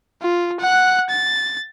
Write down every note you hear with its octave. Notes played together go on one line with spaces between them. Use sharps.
F4
F#5 F#6
A6